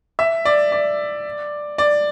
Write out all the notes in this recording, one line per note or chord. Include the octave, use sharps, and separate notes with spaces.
E5
D5
D5
D5